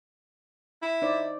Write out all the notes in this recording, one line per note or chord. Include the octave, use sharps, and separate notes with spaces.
E4
D#4 C5 D5